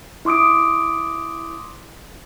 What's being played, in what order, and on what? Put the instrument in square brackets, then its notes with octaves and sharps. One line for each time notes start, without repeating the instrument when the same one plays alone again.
[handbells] E4 C6 D6 D#6 D7